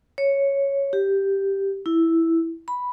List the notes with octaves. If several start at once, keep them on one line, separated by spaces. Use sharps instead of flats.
C#5
G4
E4
B5